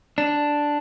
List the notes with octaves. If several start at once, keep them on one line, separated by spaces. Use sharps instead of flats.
D4